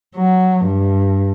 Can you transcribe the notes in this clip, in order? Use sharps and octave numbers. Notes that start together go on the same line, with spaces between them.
F#3
G2